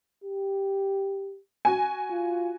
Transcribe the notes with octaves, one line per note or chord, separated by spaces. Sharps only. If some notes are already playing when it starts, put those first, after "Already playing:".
G4
F#4 G#5
F4